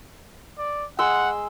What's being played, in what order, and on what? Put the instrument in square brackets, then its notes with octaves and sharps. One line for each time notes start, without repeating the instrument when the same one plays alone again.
[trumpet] D5
[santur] G#3 C6 E6 [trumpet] F#5